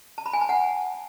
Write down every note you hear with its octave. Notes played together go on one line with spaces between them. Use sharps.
A5
B5
G#5
A5
F#5